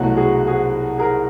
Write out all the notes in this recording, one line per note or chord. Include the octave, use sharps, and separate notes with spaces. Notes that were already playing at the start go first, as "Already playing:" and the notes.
Already playing: C2 B2 F#3 A3 F#4
F#4 G#4
F#4 G#4
G#4 A#4